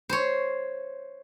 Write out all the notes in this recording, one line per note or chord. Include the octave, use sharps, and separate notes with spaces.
C5 C#5